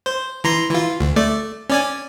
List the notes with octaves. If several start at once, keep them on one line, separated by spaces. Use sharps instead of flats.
C5
E3 A#5 C6
E3 F4
D2
A3 D5
C#4 D5 G#5